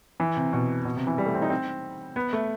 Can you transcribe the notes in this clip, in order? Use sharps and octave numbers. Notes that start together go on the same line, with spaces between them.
E3
C3
B2
B2
C3
E3
G3
A3
C4
D#4
C4
B3
A3